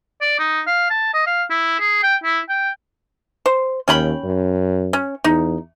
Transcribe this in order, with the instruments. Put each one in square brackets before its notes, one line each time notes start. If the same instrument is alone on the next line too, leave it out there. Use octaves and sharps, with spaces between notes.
[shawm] D5
D#4
F5
A5
D#5
F5
E4
G#4
G5
E4
G5
[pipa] C5
[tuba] D#2 [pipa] C#4 G5 B5
[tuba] F#2
[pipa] C#4
[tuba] E2 [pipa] D#4